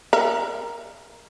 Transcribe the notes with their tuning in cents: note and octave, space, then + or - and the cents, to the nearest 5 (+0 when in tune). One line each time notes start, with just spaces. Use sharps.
A#4 +0 E5 +40